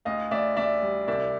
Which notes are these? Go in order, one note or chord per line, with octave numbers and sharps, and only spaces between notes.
D2 D#5 F5
D2 D5 E5
D2 D5 E5
G3
C2 D5 E5